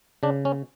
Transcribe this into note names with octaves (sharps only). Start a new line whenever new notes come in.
C#3 D4
C#4